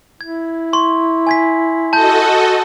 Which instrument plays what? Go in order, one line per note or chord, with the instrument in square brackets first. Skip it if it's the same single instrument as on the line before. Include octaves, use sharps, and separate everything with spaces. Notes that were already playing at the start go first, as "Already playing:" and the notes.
[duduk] E4 [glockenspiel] G#6
[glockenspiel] C6 C#6
G#5 G#6 B6
[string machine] F#4 A4 D#5 [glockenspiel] A5 G6